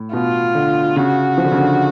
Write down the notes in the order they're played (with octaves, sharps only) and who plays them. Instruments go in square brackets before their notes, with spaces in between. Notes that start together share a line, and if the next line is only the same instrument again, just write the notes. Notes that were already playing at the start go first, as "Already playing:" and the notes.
Already playing: [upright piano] A2
[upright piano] B2 [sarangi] F4
[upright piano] D3
[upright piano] C#3 [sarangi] F#4
[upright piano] F3
D3
C#3
D3